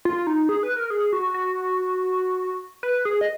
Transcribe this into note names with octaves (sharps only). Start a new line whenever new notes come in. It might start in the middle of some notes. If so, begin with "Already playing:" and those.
F4
D#4
G#4
B4
A#4
G#4
F#4
F#4
B4
G#4
D#5